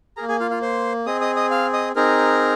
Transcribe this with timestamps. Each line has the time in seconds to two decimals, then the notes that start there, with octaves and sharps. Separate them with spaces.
0.17 G#4 A#4 A#5
0.21 A#3
0.28 G#4 G#5
0.40 F4 F5
0.51 F4 F5
0.62 C5 C6
1.06 C4 G#4 D#5 D#6
1.21 D#5 D#6
1.36 D#5 D#6
1.51 F5 F6
1.73 D#5 D#6
1.96 C4 D#4 G#4 A#4 A#5